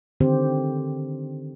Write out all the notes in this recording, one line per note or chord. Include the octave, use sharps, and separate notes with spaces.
D3 D#3 C4 G4 C5